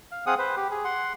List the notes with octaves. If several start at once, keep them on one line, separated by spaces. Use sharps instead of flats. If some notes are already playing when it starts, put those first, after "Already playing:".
F5
C4 G#4 F5 F#5 D#6
B4 C5
G4
G#4
F#5 C6